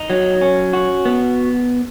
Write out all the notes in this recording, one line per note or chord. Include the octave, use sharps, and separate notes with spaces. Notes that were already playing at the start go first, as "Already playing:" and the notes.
Already playing: D#4
F#3
C#4
F#4
B3